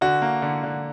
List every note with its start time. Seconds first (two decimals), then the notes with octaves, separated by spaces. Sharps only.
0.01 D3 F#4
0.22 A#3
0.42 D3
0.63 D3